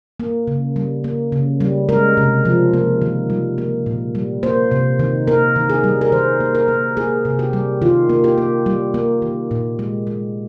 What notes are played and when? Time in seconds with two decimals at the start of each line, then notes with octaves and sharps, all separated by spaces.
0.20 A#3
0.47 C#3
0.76 G3
1.04 A#3
1.32 C#3
1.60 G3
1.89 G#3 A#4
2.17 C3
2.45 F3
2.74 A#3
3.02 D#3
3.30 G3
3.58 A#3
3.86 A#2
4.15 G3
4.43 A#3 C5
4.71 C3
4.99 D#3
5.27 A#3 A#4
5.56 D#3
5.70 G#4
5.84 G3
6.01 A#4
6.12 D#3 C5
6.40 A#3
6.55 A#4
6.68 A#3
6.97 A#3 G#4
7.25 C3
7.39 G4
7.53 G3
7.82 D#3 F4
8.09 A#3
8.24 G4
8.38 A#3
8.66 G3
8.94 A#3
9.22 D#3
9.51 A#2
9.79 G#3
10.07 G#3